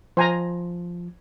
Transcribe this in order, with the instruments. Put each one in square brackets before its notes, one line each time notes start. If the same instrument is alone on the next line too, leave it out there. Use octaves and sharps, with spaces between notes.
[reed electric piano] F3 [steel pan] C5 G#5 A#5